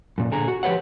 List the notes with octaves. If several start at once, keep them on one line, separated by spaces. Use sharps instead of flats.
F#2 A#2
A#2 D3 G#4 A#5
F#4
F3 G4 B4 C#5 F#5